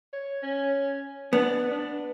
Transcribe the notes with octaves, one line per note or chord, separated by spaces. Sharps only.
C#5
C#4
B3 D4
D4